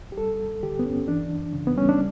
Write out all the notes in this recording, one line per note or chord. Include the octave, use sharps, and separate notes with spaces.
G4
G3 A4
G2
D3 G4
B3
G2 C#4
E3 D4
F#2
C#3
B3
G3 C#4
D4